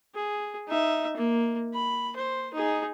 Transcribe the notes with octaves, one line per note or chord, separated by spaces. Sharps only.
G#4
D#4 E5
A#3
B5
C5
D#4 G#4